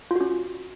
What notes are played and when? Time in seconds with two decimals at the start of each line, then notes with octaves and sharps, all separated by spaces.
0.11 F4
0.16 F#4
0.21 C#4